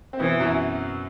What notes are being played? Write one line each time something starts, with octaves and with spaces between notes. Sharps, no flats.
C4
B2 E3 B3
F#2 F#3